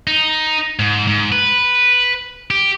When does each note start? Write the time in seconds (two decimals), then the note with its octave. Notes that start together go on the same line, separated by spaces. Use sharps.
0.07 D#4
0.79 G#2
1.07 G#2
1.32 B4
2.51 G4